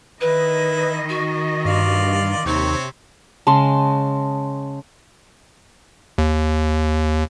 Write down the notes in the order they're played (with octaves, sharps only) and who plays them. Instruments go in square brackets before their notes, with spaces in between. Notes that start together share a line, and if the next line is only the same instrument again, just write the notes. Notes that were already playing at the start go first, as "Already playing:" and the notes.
[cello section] D#3 D#5 [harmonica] E4 [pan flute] B4
[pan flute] F#4
[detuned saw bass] G2 [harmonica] F4 D5 F5
[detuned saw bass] D#2 [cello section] C3 [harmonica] C4 C#5 [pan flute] D#4
[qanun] C#3 G#3 [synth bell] A5 C6
[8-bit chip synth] D#2